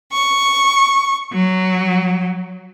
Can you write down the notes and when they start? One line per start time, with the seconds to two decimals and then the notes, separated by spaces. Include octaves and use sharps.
0.12 C#6
1.33 F#3